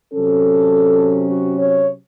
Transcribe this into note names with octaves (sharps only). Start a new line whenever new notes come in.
C3 F#3 C#4 A4
F#4
C#5